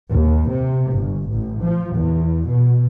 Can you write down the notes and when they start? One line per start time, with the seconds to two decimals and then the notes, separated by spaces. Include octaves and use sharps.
0.11 D#2
0.50 C3
0.93 G1
1.31 A1
1.63 F3
1.95 E2
2.48 B2